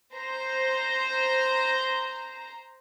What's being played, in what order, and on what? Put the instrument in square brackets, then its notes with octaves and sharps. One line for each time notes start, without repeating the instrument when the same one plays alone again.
[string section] C5 A#5